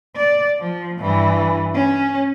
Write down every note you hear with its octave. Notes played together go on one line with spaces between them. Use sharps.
D5
F3
G2 E3
C#4